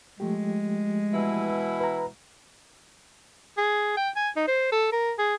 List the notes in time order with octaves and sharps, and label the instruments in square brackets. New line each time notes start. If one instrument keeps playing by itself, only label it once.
[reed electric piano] F3 A3 G4 [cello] G#3
[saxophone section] B2 E3 E4
[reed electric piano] B4 A#5
[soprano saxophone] G#4
G5
G#5
D#4
C5
A4
A#4
G#4